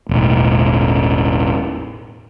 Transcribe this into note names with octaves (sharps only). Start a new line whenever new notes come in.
E1 A1